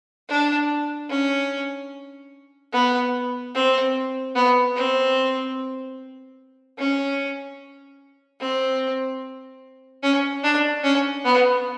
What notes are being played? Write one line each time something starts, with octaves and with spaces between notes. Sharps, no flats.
D4
C#4
B3
C4
B3
C4
C#4
C4
C#4
D4
C#4
B3